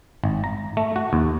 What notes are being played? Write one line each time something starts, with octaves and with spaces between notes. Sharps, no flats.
G#1
A#5
A3
F#4
D#2